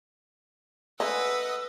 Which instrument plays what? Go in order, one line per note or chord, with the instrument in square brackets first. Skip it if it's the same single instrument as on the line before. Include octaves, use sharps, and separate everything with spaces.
[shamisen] G#3 A3 C#4 [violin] B4 F#5 [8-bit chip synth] D#5 [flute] E6